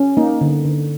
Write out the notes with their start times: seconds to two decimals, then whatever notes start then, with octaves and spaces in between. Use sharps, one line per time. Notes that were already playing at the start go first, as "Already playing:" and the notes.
Already playing: C#4
0.17 A#3 D#4
0.41 D3
0.65 D3